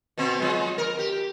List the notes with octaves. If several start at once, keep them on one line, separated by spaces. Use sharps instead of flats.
B2 B3 C4
F3 G#3
A#4
G4